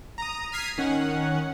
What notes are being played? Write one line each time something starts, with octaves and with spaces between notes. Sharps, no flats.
A#5 D#6
F6 G#6 B6 C7 D#7
D#3 C#4 F#5